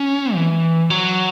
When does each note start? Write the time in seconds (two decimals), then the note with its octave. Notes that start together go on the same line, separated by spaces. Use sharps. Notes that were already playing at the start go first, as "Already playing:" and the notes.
Already playing: C#4
0.35 E3
0.90 F#3